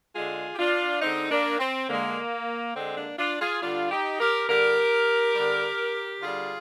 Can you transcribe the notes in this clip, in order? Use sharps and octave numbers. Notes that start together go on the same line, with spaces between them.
D3 G#3 F4 G#4
G4
D4 F4
D3 G#3 C4 D#4
A#3 D4
C4
D3 G#3 A#3
D3 G#3 C4
A#3 D4
D4 F4
F4 G#4
D3 G3 D4 F4
D#4 G4
G4 A#4
D3 G3 G4 A#4
D3 G3
D3 G3 F4 G#4